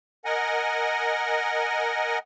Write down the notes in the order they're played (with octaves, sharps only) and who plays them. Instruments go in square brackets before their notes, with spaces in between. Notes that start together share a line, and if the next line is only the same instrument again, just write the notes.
[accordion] A#4 D#5 F#5 G#5